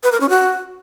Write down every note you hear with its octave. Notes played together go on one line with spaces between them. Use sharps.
B4
A#4
C#4
F#4